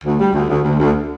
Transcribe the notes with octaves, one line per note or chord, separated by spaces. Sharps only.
D2
G3
D2
D2
D2
D2